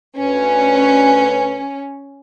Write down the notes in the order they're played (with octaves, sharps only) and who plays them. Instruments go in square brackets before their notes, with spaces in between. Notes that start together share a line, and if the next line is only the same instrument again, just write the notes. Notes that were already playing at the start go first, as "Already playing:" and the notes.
[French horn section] D2 B4 [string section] C#4